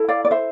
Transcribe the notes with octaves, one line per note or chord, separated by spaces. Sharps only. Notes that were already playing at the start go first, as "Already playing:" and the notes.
Already playing: E4 A4
D5 F5
D5
C5 E5